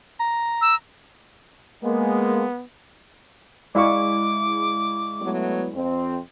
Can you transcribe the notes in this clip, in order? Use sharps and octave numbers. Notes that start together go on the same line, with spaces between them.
A#5
E6
G#3 A#3 B3
G#3 E4 D5 F5 C#6 D6
F#3 A3 B3
F2 C4